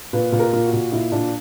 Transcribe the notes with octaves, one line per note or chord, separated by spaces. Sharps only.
A#2 B4
A#2
A#4
A#2
F#4
A#2
A#2 E4
A#2 D4